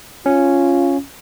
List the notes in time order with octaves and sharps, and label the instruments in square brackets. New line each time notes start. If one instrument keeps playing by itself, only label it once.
[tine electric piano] C#4 [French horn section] F4